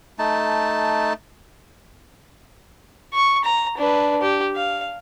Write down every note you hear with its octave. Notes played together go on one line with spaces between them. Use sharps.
A3 D#4 A5
C#6
A#5
D4 B4
G4
F5